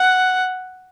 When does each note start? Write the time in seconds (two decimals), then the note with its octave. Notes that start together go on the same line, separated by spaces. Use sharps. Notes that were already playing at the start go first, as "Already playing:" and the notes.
Already playing: F#5